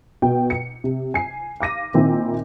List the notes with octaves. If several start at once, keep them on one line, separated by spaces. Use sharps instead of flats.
B2 G5
C#7
C3
G#5 C7
F5 D6 A#6 D#7
A#2 D#3 C4 E4